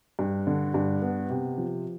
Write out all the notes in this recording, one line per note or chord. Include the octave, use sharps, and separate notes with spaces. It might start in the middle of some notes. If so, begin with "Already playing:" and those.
G2
D3
G2
B3
C3
F3